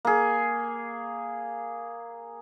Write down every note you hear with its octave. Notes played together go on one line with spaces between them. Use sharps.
A#3 G#4